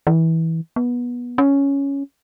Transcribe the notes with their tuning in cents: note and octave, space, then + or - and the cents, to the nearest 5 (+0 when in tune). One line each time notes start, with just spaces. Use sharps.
E3 -20
B3 -20
C#4 +5